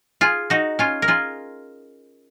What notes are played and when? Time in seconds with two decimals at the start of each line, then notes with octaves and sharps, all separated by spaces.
0.21 F4 G#4
0.50 D#4 F#4
0.79 C#4 F4
1.02 A#4
1.08 F4 G#4